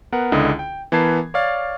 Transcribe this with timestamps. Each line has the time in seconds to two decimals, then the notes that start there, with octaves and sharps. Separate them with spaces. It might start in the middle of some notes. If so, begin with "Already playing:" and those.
0.12 B3 A#4 F#5
0.32 C#2 D3 D4 E4 D#5 D#6
0.59 G5
0.92 E3 B3 A#4 A5 G#6 C7
1.34 C#5 D5 F5 A6